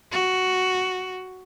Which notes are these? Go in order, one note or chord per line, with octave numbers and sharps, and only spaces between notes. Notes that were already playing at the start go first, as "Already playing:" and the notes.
F#4